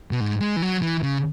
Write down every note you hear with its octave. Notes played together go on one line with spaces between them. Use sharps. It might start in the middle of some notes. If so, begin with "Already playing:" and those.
B2
G#2
G#3
E3
F#3
E3
C#3